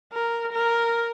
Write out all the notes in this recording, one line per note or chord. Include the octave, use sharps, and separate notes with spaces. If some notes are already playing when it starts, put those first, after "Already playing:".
A#4
A#4